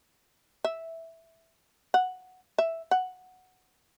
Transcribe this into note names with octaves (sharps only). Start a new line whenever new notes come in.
E5
F#5
E5
F#5